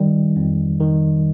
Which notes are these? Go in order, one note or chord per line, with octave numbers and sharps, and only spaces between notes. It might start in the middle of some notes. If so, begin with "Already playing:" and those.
Already playing: D#3 G3
F2
D#3